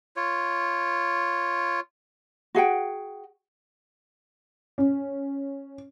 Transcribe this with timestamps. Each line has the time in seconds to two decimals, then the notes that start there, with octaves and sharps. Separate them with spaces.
0.16 F4 C#5
2.55 F#4 G#4 F#5 G5
4.78 C#4